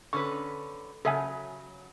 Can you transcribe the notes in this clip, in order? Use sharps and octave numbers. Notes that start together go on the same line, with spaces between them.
D3 C#4 B4 C#6
C#3 F#3 A4 E5 G#5